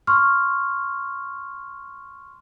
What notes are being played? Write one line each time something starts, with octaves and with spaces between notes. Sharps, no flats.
C6 C#6 F6